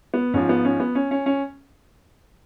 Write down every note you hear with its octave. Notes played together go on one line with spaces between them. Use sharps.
B3
G#2 F3 C#4
B3
C#4
B3
C#4
C#4
C#4